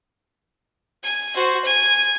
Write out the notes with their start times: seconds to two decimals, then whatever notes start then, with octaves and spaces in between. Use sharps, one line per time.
1.03 G#5
1.35 F#4 C5
1.64 G#5